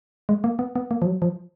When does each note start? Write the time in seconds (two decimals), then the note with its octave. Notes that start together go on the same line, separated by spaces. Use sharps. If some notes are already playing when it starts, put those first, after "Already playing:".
0.29 G#3
0.44 A#3
0.59 B3
0.76 B3
0.91 A#3
1.02 F3
1.06 F#3
1.22 F3